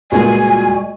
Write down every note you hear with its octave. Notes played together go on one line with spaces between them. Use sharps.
C#2 A#2 G3 G#3 F#4 G#5